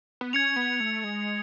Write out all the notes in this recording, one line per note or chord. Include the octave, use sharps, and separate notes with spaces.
B3
C#4 G#6 C#7 F7
B3
A3
G#3